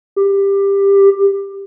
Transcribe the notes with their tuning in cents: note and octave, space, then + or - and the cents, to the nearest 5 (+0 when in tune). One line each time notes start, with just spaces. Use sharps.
G4 +15